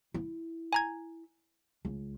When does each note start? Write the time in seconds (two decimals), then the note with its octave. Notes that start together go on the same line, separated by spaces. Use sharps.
0.14 E4
0.73 G#5 A#5 G#6
1.85 C#2